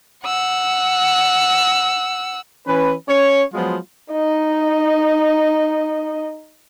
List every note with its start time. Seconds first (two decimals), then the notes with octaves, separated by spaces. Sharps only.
0.24 F#5 E6
2.67 E3 C#4 B4
3.08 C#4 C#5
3.53 F3 F#3 G#3 B3 F4
4.12 D#4 D#5